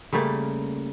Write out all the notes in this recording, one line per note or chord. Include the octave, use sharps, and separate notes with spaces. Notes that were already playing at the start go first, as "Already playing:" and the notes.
C#3 G3 A3 A#3